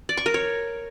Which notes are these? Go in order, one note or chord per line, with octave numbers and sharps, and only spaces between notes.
D5
C#6
A#4
C#5